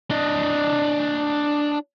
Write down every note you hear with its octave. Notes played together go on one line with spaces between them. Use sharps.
D4 D#5